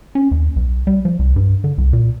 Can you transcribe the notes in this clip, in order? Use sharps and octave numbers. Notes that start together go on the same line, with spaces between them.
C#4
D#2
B1
G3
F3
C2
G2
D3
C2
A#2